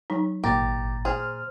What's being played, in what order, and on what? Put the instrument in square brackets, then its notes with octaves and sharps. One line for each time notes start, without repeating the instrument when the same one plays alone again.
[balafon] F#3 D#4
[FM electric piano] G#1 [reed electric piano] A#2 A#5 A6 [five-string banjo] G4
[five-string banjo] G#4 [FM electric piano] C5 F6